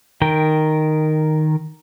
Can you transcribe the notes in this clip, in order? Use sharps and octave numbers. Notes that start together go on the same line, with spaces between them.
D#3 A#4 G5